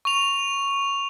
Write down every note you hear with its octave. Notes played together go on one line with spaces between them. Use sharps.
C#6 F7